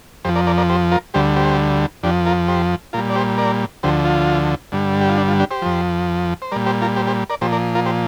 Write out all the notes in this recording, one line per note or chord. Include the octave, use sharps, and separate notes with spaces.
F2 F3 G4 C5
A#4 D5
A#4 D5
A#4 D5
G4 C5
F4 A#4
D2 D3 G3 G4 C5
G4 C5
F2 F3 D4 G4
F4 A#4
G4 C5
A#2 G3 F4 A#4
D5
G4 C5
A#4 D5
D2 D3 F3 G4 C5
F4
G2 D3 G3
G4
F4
D4
F4
D4 G4
G4 C5
F2 F3
C5
A#2 G3 A#4 D5
G4 C5
F4 A#4
G4 C5
G4 C5
A#4 D5
A#2 F3 G4 C5
A#4 D5
F4 A#4
G4 C5